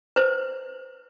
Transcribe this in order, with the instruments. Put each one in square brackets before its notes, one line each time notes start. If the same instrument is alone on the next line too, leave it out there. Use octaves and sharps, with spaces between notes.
[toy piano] B4 C5